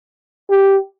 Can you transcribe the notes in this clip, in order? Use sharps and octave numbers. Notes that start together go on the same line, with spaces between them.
G4